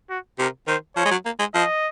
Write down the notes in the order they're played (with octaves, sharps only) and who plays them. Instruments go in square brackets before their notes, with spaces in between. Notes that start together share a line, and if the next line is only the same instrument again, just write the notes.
[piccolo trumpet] F#4
[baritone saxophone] C3 [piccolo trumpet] A#4
[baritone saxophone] D#3 [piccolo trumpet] C5
[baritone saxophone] F3 [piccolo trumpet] C#5
[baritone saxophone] G#3
F#3
A#3
G#3
[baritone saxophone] F3 [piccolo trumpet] D#5